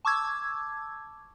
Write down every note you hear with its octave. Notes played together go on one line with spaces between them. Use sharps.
A5 C#6 D6 E6 G#6